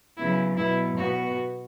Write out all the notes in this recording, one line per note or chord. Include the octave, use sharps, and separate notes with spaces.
C#3 F#3 B3 E4
B2 F#3 B3 E4
B2 B3 F#4